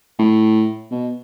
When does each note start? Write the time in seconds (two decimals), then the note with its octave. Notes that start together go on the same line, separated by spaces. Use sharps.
0.19 A2
0.91 B2